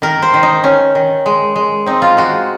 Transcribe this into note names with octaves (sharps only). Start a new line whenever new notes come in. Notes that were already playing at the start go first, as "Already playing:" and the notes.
D#3 A#4
C5
D#3
D#4
D#3 C#4
D#3
G#3
G#3
C4 D#4
F4
G#3 F#4